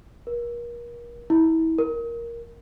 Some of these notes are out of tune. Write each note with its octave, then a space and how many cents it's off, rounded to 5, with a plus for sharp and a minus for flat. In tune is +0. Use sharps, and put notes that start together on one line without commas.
A#4 +35
E4 -30
A#4 +5